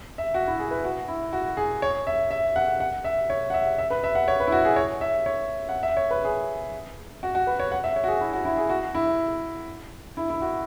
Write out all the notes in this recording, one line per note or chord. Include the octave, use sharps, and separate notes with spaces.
E5
F#4
E4
G#4
B4
F#4
E4
F#4
G#4
C#5
E5
E5
F#5
F#5
E5
C#5
F#5
E5
E5
B4
E5
F#5
C#5
B4
E4
F#4
G#4
C#5
E5
C#5
F#5
E5
C#5
B4
G#4
F#4
F#4
B4
C#5
F#5
E5
C#5
F#4
G#4
E4
F#4
E4
G#4
F#4
E4
E4
E4
F#4